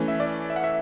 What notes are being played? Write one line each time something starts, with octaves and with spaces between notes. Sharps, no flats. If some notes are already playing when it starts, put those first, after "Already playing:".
Already playing: E3 A3 C#4
E5
D5
E5
F#5
E5